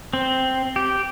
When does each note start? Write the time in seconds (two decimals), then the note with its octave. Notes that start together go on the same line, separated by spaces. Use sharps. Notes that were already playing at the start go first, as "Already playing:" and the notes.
0.13 C4
0.76 G4